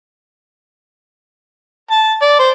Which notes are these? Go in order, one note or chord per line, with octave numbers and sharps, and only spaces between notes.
A5
D5
C5